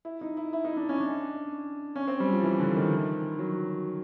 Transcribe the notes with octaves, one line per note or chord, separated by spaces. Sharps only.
E4
D#4
E4
E4
D#4
D4
C#4
D4
C#4
C4
G3
F3
E3
D3
D#3
F#3